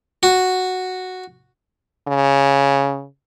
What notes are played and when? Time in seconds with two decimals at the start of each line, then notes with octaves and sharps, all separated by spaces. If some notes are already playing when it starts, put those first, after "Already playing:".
0.23 F#4
2.08 C#3